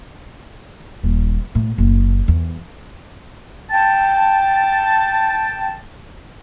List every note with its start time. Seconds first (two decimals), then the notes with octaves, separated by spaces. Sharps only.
1.03 D#1
1.55 A2
1.78 F#1
2.28 E2
3.71 G5 A5